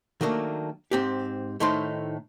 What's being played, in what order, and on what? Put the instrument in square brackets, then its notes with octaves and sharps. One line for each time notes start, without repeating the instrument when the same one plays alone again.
[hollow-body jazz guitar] D#3 F#3 A3 A#3 D4
G#2 C4 G4
A2 D#3 A3 D#4 C5 C6